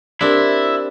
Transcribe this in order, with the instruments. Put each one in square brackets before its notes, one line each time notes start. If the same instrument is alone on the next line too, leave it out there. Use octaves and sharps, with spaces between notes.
[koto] C4 D4 [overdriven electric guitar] E4 [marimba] G4 A#4